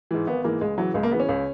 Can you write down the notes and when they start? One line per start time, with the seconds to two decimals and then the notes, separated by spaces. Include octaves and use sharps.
0.11 G#2 E3
0.27 G#1 B3
0.44 G#2 E3 A#3
0.61 C#2 G#3
0.78 C#3 E3 F#3
0.94 C#2 G#3
1.03 A#3
1.11 C#3 E3 B3
1.20 C#4
1.29 C#2